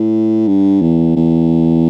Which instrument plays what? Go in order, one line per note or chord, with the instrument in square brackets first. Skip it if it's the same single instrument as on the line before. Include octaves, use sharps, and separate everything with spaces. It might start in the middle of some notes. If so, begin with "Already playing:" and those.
Already playing: [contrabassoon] A2
G2
E2
E2